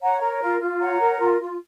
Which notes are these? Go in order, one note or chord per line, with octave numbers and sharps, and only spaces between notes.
C#5 F#5 A#5
A#4
F4
F4
C#5 F#5 A#5
A#4
F4
F4